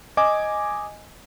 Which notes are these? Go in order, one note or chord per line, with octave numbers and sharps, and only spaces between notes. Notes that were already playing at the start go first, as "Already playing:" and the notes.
D#5 G#5 D6